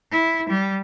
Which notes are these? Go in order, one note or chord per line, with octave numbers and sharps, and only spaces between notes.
E4
G3